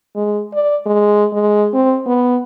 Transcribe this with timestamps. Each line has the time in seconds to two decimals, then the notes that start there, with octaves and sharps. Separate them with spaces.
0.16 G#3
0.54 D5
0.86 G#3
1.34 G#3
1.74 C4
2.07 B3